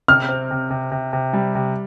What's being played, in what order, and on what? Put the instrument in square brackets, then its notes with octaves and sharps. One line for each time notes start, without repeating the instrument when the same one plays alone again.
[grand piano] C3 [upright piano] F6
[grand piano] C4
C3
C3
C3
C3
G3
C3